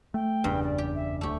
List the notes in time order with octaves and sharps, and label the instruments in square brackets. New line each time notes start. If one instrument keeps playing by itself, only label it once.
[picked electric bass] A3 [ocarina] G5
[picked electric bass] F#1 E2 C#3 [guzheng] G2
[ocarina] D5
[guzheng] G4
[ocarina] E5
[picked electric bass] D1 D2 [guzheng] A3 G4 [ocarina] C#6